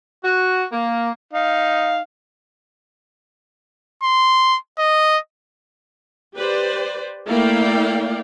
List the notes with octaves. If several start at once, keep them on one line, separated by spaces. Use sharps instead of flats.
F#4
A#3
D#4 F5
C6
D#5
G4 B4 C5 D5
A3 A#3 E4 D5 F5 G5